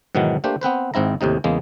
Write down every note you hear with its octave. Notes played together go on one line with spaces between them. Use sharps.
G#2 B2 D#3 E3 F#3
A3 A#3 D4 G4 C5
B3 C4 B4 C5
G#1 G#2 C4 E4 A#5
D#2 A2 C3 D#4
E2 C#3 G#3 A#3